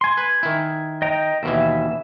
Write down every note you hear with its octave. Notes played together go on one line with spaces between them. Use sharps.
G#5 C6
B4
D#3 E4
D#5 G5 A#5
D#2 B2 E3 E5